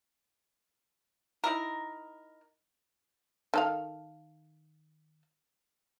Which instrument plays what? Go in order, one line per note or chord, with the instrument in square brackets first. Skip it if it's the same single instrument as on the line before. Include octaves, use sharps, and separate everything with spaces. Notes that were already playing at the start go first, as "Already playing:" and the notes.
[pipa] D#4 E4 A#4
[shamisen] D#3 A4 F5